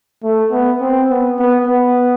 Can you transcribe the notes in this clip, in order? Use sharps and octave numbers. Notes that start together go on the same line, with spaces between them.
A3
B3
C4
B3
B3
B3